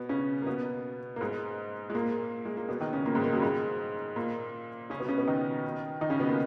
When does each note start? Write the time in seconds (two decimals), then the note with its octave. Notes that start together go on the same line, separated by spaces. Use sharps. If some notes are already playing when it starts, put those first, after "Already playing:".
Already playing: B2 B3
0.09 C#3 C#4
0.42 A#3
0.47 B2 B3
1.16 A#3
1.21 G#2 G#3
1.90 G#3
1.95 A#2 A#3
2.45 G#3
2.57 A#3
2.69 B2 B3
2.81 D#3 D#4
2.93 C#3 C#4
3.05 A#2 A#3
3.15 G#2 G#3
3.23 A#2 A#3
3.33 F#2 F#3
3.42 G#2 G#3
4.16 A#2 A#3
4.90 C#3 C#4
5.00 B2 B3
5.08 C#3 C#4
5.18 B2 B3
5.27 D#3 D#4
6.01 D#3 D#4
6.10 C#3 C#4
6.19 B2 B3
6.29 A#2 A#3